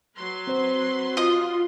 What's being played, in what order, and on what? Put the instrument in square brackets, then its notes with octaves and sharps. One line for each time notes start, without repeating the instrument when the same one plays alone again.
[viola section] F#3 B4 C6
[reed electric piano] C4 C5
[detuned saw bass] F4 [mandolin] D#5 D#6